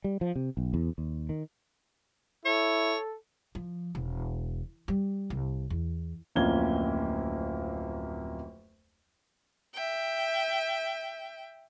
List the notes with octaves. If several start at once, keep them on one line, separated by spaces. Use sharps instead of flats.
G3
F3
C3
B1
E2
D#2
D#3
E4 A4 C#5
F3
E1
G3
C2
E2
D1 F2 A#3 C#4 G#6 G7
E5 G5